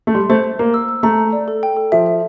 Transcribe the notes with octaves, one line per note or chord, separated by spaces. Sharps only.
A3
G3 C6
A3 C5
C5
A#3 A#5
E6
E6
A3 A#5
A#5
D5
A4
G5
A4
F3 E5
E5